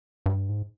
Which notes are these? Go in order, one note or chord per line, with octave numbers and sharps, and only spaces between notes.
G2
G#2